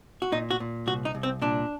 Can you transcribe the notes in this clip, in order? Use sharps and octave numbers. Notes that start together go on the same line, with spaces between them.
F#4
A#2 D#4
F#4
A#2
C2 F#4
D#4
C2
C4
A#2 D4